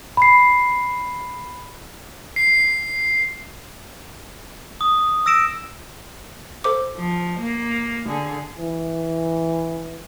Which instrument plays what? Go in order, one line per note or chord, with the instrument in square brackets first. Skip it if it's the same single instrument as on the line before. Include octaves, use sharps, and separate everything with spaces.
[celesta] B5 C7
[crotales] C7
[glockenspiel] D#6
E6 A#6 D7 E7
[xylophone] A4 C5 D6
[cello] F3
A#3
D3 G#4
[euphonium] E3